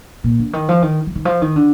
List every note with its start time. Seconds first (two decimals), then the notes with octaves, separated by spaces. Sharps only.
0.24 A#2
0.39 D3
0.53 D#3
0.69 F3
0.82 D#3
1.07 F3
1.15 D#3
1.25 F3
1.42 D#3
1.56 D3